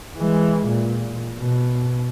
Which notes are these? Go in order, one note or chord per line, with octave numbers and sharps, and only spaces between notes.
E3 G#3
A#2
B2